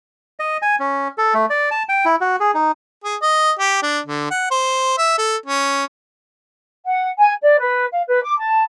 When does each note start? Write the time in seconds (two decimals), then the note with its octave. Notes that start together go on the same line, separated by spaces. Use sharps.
0.40 D#5
0.62 G#5
0.80 C#4
1.18 A4
1.34 A3
1.50 D5
1.71 A5
1.89 G5
2.05 E4
2.21 F#4
2.40 G#4
2.54 D#4
3.04 G#4
3.22 D#5
3.59 G4
3.82 D4
4.06 D3
4.30 F#5
4.51 C5
4.98 E5
5.18 A4
5.46 C#4
6.85 F#5
7.18 G#5
7.42 D5
7.59 B4
7.92 F5
8.07 B4
8.23 D6
8.38 A5